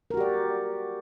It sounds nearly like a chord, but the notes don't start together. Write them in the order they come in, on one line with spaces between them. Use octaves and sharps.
A#4 F#4 G4 D5